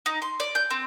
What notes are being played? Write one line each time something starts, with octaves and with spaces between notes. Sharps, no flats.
D#4
C6
D5
G6
C4